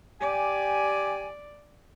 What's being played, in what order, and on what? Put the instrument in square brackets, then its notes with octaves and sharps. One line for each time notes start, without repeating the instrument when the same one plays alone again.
[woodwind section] G4 G#5 [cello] D5